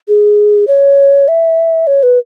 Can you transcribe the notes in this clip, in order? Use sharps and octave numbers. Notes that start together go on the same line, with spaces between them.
G#4
C#5
E5
C#5
B4